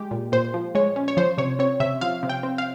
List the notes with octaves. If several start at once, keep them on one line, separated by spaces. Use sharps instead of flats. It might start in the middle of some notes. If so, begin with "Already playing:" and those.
Already playing: G#3 G4
A#2
A#2 C5
F3
G#3 C#5
C#4
C#5
F3 C5
C3 C#5
C4 C#5
C3 E5
F3 F5
C3
G5
C4
F5